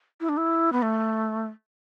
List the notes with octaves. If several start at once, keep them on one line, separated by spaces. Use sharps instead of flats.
E4
D4
E4
B3
A3